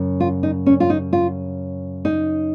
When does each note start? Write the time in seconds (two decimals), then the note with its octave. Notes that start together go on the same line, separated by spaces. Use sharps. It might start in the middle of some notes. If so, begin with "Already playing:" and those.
Already playing: F#2 C#3
0.20 F4
0.43 D#4
0.66 C#4
0.80 F4
0.90 D#4
1.13 F4
2.05 D#4